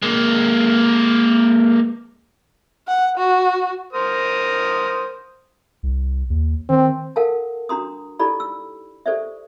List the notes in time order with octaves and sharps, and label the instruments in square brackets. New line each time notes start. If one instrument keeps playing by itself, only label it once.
[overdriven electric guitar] G#3 A#3
[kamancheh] F#5
F#4
[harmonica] A#4 C5 D#6
[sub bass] C2
D#2
[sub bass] D#3 [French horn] C4
[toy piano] A4 A#4 F5 F#5 G#5 A5
D4 F#4 A#5 C6 D#6
D#4 E4 G4 A4 D5 B5
E6
G4 A4 C5 D5 E5